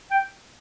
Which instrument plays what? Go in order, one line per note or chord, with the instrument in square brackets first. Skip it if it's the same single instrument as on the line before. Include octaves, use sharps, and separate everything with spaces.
[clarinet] G5